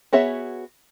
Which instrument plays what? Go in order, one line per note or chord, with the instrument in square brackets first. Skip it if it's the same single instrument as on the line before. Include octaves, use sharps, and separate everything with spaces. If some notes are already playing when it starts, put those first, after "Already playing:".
[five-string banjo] B3 F#4 G#4 C#5 E5